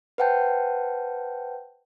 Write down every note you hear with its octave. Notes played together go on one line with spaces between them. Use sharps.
B4 C5 F#5 G5 A5 G6